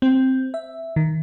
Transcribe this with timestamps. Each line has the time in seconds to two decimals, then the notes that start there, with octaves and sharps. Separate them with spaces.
0.02 C4
0.54 E5
0.96 D#3